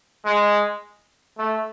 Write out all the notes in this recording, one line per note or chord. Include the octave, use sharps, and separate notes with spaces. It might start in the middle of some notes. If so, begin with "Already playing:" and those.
G#3
A3